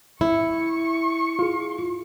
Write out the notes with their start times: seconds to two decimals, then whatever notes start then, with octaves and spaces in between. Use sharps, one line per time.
0.21 E4 C#6
1.39 F4 G#4